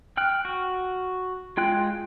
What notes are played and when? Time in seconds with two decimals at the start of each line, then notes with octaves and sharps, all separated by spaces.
0.17 G5 F6 F#6
0.45 F#4
1.57 G#3 F4 G5 F#6